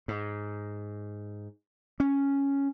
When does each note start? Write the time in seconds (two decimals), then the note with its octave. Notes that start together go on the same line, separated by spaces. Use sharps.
0.08 G#2
2.00 C#4